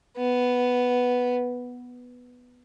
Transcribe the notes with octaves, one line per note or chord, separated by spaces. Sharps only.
B3